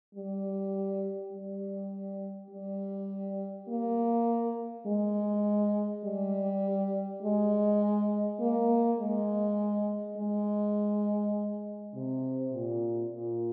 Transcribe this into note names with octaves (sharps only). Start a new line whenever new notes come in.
G3
G3
G3
A#3
G#3
G3
G#3
A#3
G#3
G#3
C3
A#2
A#2